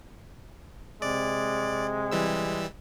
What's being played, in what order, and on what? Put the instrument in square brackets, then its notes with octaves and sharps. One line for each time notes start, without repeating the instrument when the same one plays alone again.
[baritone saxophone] C3 [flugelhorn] G#3 [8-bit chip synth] D5
[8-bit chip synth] E3 G3 E6